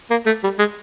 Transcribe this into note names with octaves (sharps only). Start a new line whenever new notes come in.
A#3
A3
G3
G#3